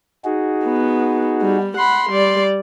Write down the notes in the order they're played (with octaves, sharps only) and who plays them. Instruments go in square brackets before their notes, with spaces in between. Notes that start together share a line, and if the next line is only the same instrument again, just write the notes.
[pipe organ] D#4 F#4 G#4
[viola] B3
G3
[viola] F#5 B5 [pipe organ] C6
[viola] G3 D5